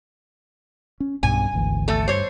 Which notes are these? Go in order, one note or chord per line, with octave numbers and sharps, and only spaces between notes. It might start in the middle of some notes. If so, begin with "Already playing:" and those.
C#4
B1 G2 B2 G#5
G#1 D2 E3
A3 A4
G2 C5 C#5